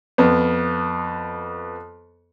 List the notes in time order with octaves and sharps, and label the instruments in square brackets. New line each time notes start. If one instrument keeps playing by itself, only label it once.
[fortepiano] F2 B3